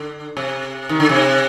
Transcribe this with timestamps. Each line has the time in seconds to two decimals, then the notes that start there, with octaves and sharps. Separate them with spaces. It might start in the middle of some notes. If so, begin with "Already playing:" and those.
Already playing: D3
0.37 C3
0.89 D#3
1.00 D3
1.09 C3